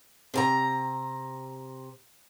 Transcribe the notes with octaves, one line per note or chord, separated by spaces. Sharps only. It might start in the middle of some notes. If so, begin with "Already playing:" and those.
C3 A5 A#5